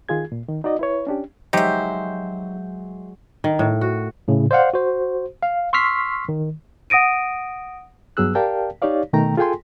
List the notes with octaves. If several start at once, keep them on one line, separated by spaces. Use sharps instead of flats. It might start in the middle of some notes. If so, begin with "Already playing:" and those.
D#3 F4 G#4 G#6
A#2
D#3
D#4 F#4 D5 D#5
E4 B4 C#5
C#4 D4 G4
F#3 G#3 D#4 G4 C5 E5
D#3
A2
F#4
A2 C#3
C5 D5 F5 F#5
F#4 C5
F5
C6 C#6 E6 F6 B6 C7
D#3
F#5 D#6 A#6 D7 D#7
G2 F#3 B3 G#4 E6 F#6
G4 A#4 D5 F5 G5 A5
D#4 G4 C#5 D5 F5
B2 D#3 A3 G5 A#5
F4 G#4 A4 G5 G#5 C6